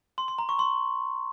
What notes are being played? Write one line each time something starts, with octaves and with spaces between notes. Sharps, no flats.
C6
C6
A#5
C#6
C6